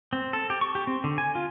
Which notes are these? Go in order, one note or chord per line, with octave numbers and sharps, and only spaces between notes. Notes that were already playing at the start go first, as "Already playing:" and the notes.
C4
A4
G4
C#6
G4
C4
D3
G#5
F4